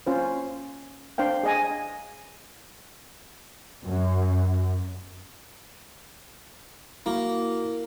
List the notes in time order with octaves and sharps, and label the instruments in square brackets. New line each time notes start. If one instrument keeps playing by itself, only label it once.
[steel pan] C#4 F4 C5
D4 C5 F5 G5
G#4 D#5 G#5
[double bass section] F#2
[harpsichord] A#3 [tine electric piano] E4 F#4